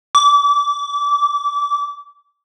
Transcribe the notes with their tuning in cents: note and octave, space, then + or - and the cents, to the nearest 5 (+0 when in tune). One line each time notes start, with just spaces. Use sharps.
D6 -25